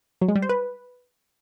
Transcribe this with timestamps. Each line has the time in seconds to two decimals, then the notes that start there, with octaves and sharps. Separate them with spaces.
0.21 F#3
0.28 G#3
0.35 G3
0.42 C5
0.49 B4